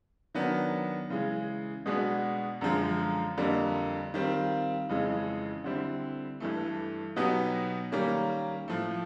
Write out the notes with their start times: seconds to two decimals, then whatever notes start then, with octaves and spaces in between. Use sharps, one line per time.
0.35 D#3 F#3 B3 D4
1.10 C#3 E3 G#3
1.86 B2 G#3 B3 D4 F#4
2.61 F#2 D3 F3 G#3
3.38 F2 D3 G3 A#3
4.14 D#3 G3 C4 F4
4.89 F2 C#3 E3 G#3
5.64 D3 G3 C4 E4
6.40 G2 E3 A3
7.16 B2 F#3 B3 D#4 G4
7.92 D#3 G3 A#3 C#4
8.68 A2 F3 A3